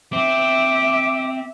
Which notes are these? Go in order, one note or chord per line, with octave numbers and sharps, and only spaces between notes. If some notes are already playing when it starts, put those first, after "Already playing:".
C4 E5 D6